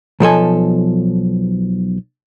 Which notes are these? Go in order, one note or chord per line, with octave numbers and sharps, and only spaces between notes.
B1 F3 A4 G#5